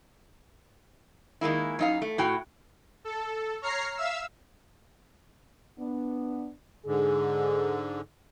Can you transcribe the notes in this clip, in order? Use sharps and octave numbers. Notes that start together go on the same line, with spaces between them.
D#3 G#3 A#3 E4
F#2 D#4 F5
A3
A2 F#4 G5
A4
C#5 A#5 F6 C7
E5 F5 E6
B3 D4
G#2 D3 G#4